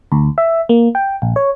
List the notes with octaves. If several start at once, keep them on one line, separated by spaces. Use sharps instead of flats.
D2
E5
A#3
G5
A#1
C#5